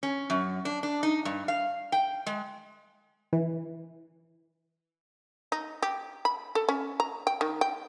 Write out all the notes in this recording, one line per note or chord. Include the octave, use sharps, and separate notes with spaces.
C#4
F#2
D4
D4
D#4
G2
F5
G5
G#3
E3
D#4
G4
B5
A4
C#4
A#5
G5
D#3
G5